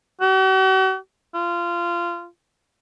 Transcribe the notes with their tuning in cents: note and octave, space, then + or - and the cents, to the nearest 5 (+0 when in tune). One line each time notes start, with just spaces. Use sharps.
F#4 +45
F4 -20